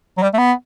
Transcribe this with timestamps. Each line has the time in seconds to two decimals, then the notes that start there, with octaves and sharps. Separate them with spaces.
0.17 F#3
0.23 G3
0.33 A3
0.38 B3